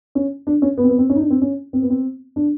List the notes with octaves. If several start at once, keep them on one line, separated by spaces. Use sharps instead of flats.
C#4
D4
C#4
B3
C4
B3
C4
C#4
D#4
D4
C4
C#4
C4
B3
C4
D4